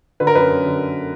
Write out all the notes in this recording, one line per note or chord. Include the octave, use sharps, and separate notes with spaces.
D3 B4
A#4
F#2 B4
F#2
D3